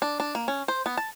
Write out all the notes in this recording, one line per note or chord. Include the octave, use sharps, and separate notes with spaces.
D4
D4
A#3
C#4
C5
B3
A5